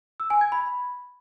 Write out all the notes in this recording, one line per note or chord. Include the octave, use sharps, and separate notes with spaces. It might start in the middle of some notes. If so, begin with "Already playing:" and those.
E6
G#5
G#6
B5